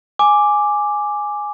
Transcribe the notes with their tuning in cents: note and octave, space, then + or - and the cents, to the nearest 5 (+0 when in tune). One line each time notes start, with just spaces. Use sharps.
G#5 +0 D6 +0